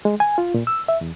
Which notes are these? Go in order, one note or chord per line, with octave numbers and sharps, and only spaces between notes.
G#3
G#5
F4
A#2
E6
E5
E2